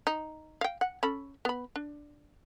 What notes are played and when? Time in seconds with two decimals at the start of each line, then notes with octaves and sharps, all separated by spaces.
0.07 D#4
0.61 F5 G5
0.81 F#5
1.03 C#4 A4 B5
1.45 B3 B5
1.76 D4